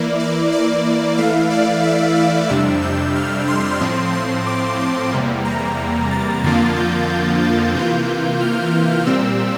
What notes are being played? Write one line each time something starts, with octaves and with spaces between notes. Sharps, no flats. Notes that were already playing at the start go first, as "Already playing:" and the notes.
Already playing: E3 A#3 E4 D5
D5
D5
E3 A3 E4 F5
D5
E5
F5
F2 C3 G3 D4 E6
G6
F6
C6
A2 F3 C4
C6
D6
D6
E2 C3 G3 A#3
A#5
A6
F2 D3 F3 A#3 F4 A6
G6
G6
A6
C3 E3 A#3 F4 G6
F6
A#2 G3 C4 E6